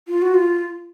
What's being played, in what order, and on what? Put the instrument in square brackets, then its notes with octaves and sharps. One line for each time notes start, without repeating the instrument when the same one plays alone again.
[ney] F4
F#4
F4